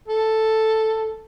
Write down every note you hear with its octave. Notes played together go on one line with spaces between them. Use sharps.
A4